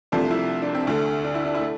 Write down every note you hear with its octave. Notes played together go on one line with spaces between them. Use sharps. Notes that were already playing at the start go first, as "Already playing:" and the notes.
C2 C3 F3 A3 D4
E4
D4
C4
D2 D3 A3
D4
E4
D4
E4
A3